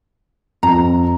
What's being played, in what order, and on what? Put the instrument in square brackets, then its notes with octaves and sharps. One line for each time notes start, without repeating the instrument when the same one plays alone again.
[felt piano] F2 [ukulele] A#5